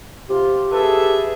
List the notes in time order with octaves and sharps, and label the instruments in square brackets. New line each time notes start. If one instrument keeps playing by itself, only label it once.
[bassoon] C3 [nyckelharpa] F4 [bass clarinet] G4
[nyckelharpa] G#4 E5 [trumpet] A4 [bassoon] B4